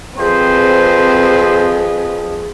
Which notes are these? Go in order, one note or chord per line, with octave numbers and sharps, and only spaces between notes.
F2 C4 G#4 B4 C5